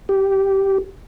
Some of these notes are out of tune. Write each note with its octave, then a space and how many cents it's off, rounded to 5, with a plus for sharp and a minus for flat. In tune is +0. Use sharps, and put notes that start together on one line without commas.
G4 -10